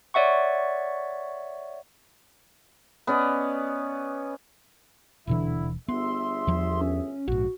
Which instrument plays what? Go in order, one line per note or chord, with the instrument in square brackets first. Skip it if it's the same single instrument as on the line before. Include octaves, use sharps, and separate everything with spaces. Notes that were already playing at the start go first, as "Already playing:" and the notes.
[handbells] C#5 D5 E5 F#5 C#6
[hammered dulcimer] B3 C#4 D5 D#5
[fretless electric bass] D#1 B2 E3 [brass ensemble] D3 E4
[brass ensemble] G1 G#4 E5 [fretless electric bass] B3 [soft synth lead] C6
[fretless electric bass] E2 F3
[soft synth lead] C#4
[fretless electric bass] A#1 G#2 [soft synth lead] F#4